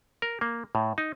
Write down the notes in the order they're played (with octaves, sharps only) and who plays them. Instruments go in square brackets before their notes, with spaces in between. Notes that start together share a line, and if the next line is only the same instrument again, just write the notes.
[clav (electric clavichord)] A#4
A#3
A2
D#4